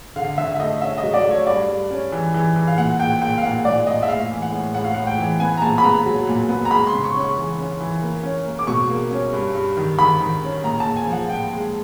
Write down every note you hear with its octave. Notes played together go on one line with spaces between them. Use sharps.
D3 F5
D3 E5
E5
A3 D#5
C#4 E5
D#5
F#3
D5
A3
C#5
G2 D5
G2
C#4
E3
E3
E3
F5
A#2 F#5
A#2 G5
A#2 G5
F5
A#2 F#5
A#2 D5
A#2 D#5
E5
A2 F5
E3
F#5
A2
A2 F#5
F5
A2 F#5
G5
E3
B3 G#5
A#5
A#2 A5
B5
B3 A#5
F#3
A#2
B3
A#5
G#3 B5
C6
C#3
C#6
C#4
C#6
E3
C#4
E3
A#3
C#4
A#3
D6
B2 C#6
A#3
C#4
G2
G2
D#3
D#3 B5
D#3
C#4
A#2 A#5
A5
A#2
G#5
F3
F#5
A#2 G5
G#3